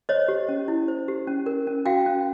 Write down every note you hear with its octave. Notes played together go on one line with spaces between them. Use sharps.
C5 C#5 D#5
G4
C#4
E4
C5
G4
C#4
A#4
C#4
F#4 F5 G5
C#4